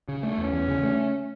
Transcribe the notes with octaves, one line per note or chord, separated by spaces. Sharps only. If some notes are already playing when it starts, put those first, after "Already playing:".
C#3
A3
E2 C#4
E2
C#3
A3